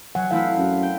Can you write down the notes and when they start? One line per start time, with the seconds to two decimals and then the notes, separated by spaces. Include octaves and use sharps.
0.15 F#3 F#5 G#5
0.31 E3 A3 C4 E4 F5
0.57 F#2
0.82 G5